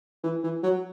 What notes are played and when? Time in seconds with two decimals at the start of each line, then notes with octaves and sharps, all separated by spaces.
0.24 E3
0.43 E3
0.63 F#3